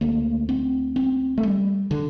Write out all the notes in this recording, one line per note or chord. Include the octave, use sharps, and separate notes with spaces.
D2 D3 A#3
C4
C4
A3
G3
D3